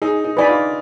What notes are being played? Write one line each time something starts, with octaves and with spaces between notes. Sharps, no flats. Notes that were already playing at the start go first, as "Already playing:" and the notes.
D#4 G#4
D#4
D#4 B4 D5 G#5 B5
F4